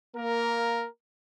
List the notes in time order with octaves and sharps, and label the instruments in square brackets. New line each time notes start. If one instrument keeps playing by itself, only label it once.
[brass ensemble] A#3 A#4